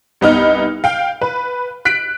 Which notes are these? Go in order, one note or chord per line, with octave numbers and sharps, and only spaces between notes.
C2 B3 D#4 F6
F5 G5
B4
F#6 B6 D7